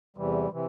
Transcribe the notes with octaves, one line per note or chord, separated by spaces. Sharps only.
E2 C3 E3 G3
C3 E3